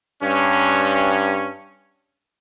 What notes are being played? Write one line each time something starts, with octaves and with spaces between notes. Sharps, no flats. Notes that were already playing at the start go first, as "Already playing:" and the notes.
G2 C#4